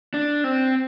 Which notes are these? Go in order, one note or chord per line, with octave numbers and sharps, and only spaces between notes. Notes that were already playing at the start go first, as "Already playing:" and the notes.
D4
C4